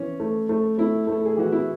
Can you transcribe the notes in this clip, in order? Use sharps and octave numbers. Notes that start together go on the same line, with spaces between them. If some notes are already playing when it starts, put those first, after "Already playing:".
Already playing: E3 C#4
A3
A3
A3 E4
A3 A4
G#4
E3 F#4
E4